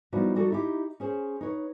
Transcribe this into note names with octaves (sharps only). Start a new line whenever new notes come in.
F3 G3 B3 D#4 E4 F#4
G3 D#4 F#4 A4
D#4 E4 G4
C#4 G#4 C5
D#4 B4 C#5